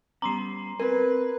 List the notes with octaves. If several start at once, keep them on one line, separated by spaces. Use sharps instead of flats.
G3 B3 C#4 A#5 C6 C7
C4 A#4 B4 G#5